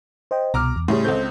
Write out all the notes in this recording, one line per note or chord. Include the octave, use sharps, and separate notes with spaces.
C5 D#5 G5
C2 B2 A#5 D6 F6
E2
A2 C#3 G3 C6
C#2 C4 A4 C5 G6